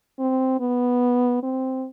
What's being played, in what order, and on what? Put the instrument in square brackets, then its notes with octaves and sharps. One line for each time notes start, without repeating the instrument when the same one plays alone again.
[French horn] C4
B3
C4